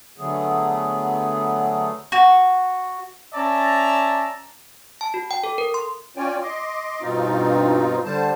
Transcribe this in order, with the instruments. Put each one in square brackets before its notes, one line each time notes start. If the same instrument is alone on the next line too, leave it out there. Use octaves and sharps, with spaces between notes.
[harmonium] D3 F#3 A3 B3 G#4
[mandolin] F#4
[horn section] C#4 D5 E5 A5 A#5
[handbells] A5
F#4
G5
A4
A#4
C6
[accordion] C#4 F4 C#5 D5 G5 G#5
D#5 C6 D6
G2 B2 C4 D#4 F4
D3 G3 C5 A5